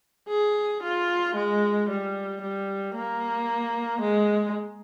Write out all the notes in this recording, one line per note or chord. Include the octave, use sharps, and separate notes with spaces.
G#4
F4
G#3
G3
G3
A#3
G#3